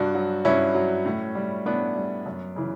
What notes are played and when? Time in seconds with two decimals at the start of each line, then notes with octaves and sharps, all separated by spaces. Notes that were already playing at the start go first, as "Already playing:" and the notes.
Already playing: G2 D4 F#4
0.15 F#3
0.45 G2 C#4 E4
0.75 F#3
1.06 A2
1.35 G3
1.66 A2 B3 D4
1.96 G3
2.26 F#2
2.56 C#3 E3